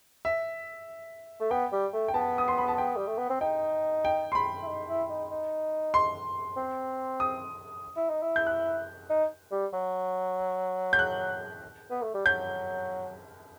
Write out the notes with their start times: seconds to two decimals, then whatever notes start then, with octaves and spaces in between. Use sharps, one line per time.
0.25 E5
1.40 A3
1.51 B3 G5
1.72 G3
1.93 A3
2.08 G5
2.14 B3 A5
2.38 D#6
2.48 C6
2.58 B5
2.68 A5
2.78 G5
2.96 G3
3.07 A3
3.18 B3
3.30 C4
3.41 D#4 G5
4.05 G5
4.32 C6
4.35 B5
4.62 E4
4.67 D#4
4.89 E4
5.09 D#4
5.31 D#4
5.94 C6
6.57 C4
7.20 D#6
7.96 E4
8.10 D#4
8.22 E4
8.36 G6
8.47 F#6
9.10 D#4
9.52 G3
9.73 F#3
10.93 G6
10.99 F#6
11.91 B3
12.02 A3
12.14 G3
12.26 F#3 G6